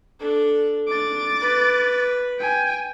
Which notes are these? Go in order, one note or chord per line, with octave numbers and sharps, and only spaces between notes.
D4 A4
D4 D6 A6
B4
G5 G#5